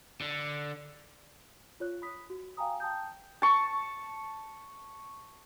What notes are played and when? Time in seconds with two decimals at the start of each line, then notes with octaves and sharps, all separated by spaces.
0.21 D3
1.80 F4 C#5 F#6
2.02 B5 D#6 B6
2.30 F#4
2.57 F5 G5 G#5 A#5 D#6
2.80 G5 A5 D#6 G6
3.42 A5 C#6